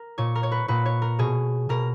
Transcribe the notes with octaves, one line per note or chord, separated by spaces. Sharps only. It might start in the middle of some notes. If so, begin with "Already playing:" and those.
Already playing: A#4
A#2 C#5
A#4
C#5
B4
A#2 B4
C#5
A#4
B2 G#4
B2 A#4